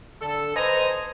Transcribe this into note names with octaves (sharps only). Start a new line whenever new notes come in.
D3 A4
B4 C5 D#5 G#5 A#5